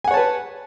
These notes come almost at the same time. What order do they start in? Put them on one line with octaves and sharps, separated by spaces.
G#5 F#5 C#5 A5 B4